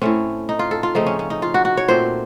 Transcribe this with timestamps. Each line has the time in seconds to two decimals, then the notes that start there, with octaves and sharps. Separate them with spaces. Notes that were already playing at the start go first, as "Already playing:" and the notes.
0.02 A2 A3 C4 C#4
0.49 D#4
0.59 F4
0.71 A4
0.83 F4
0.95 C#3 F3 A3 C4 D#4
1.06 C#4
1.19 C#4
1.30 D#4
1.42 F4
1.54 F#4
1.65 F#4
1.77 C#5
1.88 A#2 A3 C4 C5